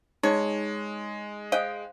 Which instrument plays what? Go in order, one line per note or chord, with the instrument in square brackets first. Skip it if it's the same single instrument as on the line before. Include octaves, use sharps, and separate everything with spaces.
[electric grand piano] G#3 [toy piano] D#4 [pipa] C#5
[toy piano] C5 F5 [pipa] D#5 G5